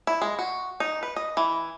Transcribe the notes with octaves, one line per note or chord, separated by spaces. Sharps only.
E4
G#3
F#4
D#4
B4
D#5
E3